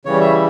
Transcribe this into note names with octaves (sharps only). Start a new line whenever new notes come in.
C#3 E3 G3 C#5
E5